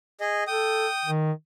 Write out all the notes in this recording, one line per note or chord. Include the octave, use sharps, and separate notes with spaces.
G#4 D#5
A4 G5 D#6
D#3